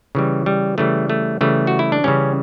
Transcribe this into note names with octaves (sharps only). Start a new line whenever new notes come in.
C#3 E3 G3
G3
C#3 E3 G3 A3
A3
C#3 E3 G3 A3
F#4
E4
D4
C#3 E3 G3 C#4